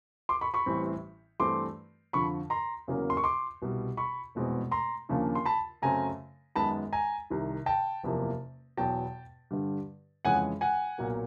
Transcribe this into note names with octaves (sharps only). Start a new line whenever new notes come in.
C6 D6
B5 C#6
B5 C#6
A1 A2 E3 G3 C4
G2 E3 A3 C4 C6 D6
F2 D3 F3 B5 C#6
A#5 C6
E2 C#3 F#3 A#3 C#4
C6
C#6
C6 D6
C2 B2 G3
B5 C#6
F1 E2 B2 G#3 C4
A#5 C6
D#2 C#3 F3 A#3 D4
C6
A5 B5
F#2 C#3 F#3 A3 C4 G#5 A#5
F#2 D#3 G#3 B3 A5 B5
G#5 A#5
C2 C3 D#3
G5 A5
F#1 E2 C3 F3 A#3
E2 B2 F#3 G5 A5
G2 D3 G3
F2 C#3 E3 G#3 C#4 F#5 G#5
F#5 G#5
B1 A#2 F#3 A#3